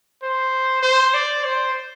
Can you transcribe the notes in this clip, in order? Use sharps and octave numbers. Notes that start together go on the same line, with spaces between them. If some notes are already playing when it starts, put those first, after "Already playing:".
C5
C5
D5
C5